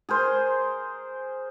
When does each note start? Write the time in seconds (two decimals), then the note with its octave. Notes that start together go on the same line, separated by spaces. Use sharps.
0.09 G#4 A#4 C5